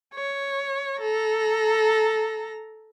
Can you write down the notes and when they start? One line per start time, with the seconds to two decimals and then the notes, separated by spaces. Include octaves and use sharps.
0.14 C#5
1.00 A4 A#5